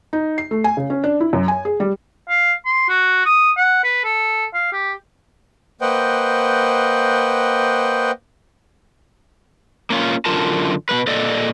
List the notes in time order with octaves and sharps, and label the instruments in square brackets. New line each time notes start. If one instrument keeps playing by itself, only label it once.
[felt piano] D#4
C7
A3
G#5
C#3
C#4
D4
E4
F#2
G#5
G#4
G3
[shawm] F5
C6
F#4
D#6
F#5
B4
A4
F5
G4
[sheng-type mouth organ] A#3 B4 C5 D#5 F#5 G5
[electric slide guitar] A#3 C#4 F4
F#2 D3 F4 A#4 A5
B2 G#3 B4
A#2 A4 D5 D#5